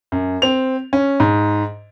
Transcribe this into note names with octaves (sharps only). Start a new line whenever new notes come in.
F#2
C4 F7
C#4
G#2